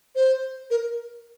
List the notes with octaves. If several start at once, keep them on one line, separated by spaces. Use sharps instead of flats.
C5
A#4